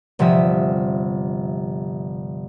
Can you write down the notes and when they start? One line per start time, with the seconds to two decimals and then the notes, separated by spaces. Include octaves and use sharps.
0.19 G1 C3 F3 E5 D#6